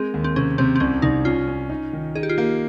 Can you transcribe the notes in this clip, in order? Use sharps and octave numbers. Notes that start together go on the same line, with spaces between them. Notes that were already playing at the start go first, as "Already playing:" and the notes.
Already playing: G#3 C4 G#4 A#4
D#2
C4
C3 C#4
C3 C4
C4
C2 C#4
C2 D#4
C#4 F4
C#4
D#4
D#3
D#4 G#4
G4
F4
A#3 G4